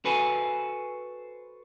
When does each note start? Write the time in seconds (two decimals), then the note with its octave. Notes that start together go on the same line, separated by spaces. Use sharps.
0.05 F#4 A4 B4 C5 G#5